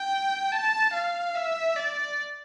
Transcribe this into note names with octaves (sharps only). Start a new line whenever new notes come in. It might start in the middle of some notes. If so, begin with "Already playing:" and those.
Already playing: G5
A5
F5
E5
D5